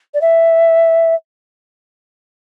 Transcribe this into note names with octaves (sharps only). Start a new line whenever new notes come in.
D5
E5